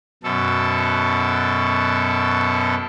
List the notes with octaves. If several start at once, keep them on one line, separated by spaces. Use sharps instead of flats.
F#2 B2 A4